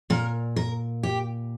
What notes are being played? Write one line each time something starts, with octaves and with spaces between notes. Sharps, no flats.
A#2 A#4
A#4
G4